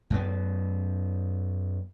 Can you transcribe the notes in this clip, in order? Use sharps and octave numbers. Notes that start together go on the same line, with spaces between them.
F#2 B3